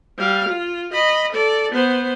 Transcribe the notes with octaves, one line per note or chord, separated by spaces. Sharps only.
G3 F5
F4
D#5 B5
A4 D5
B3 C5